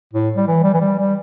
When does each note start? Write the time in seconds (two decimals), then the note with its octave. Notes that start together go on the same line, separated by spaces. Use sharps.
0.13 A2
0.37 G3
0.48 E3
0.64 G3
0.74 E3
0.81 G3
0.99 G3